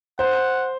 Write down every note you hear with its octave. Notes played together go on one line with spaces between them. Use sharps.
C5 F#5